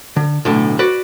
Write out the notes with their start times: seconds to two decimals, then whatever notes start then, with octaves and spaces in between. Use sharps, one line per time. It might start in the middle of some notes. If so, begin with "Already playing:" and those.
0.16 D3
0.45 B1 A2 D3
0.79 F#4 B4 D5